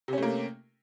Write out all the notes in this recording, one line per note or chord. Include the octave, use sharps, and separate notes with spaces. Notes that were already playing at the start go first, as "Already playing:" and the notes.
C3 A3 A#3 C#4